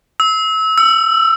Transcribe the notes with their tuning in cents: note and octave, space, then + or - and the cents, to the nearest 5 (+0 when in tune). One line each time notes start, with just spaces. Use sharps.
E6 -25
E6 +25